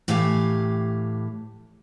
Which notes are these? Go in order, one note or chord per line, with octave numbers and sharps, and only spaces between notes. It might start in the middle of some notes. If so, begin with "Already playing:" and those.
A2 E3 G4 F5 G5 G#5